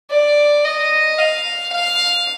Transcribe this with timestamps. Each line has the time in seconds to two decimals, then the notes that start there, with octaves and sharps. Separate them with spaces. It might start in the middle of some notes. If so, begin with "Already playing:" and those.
0.11 D5
0.65 D#5
1.19 F5
1.73 F5